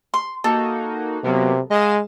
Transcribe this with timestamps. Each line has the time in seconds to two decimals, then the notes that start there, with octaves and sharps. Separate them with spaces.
0.14 C6
0.44 A#3 D#4 F#4 A4
1.24 C3 F#3 A#3 B3
1.71 G#3 D#5 F5 E7